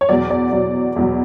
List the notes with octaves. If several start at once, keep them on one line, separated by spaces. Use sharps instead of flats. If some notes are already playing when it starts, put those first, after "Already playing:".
C#5
E2 B2 F#3 D5
D5
E2 B2 F#3
E2 B2 F#3